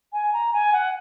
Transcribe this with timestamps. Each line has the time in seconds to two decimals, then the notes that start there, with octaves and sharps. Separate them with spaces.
0.13 G#5
0.33 A#5
0.53 G#5
0.73 F#5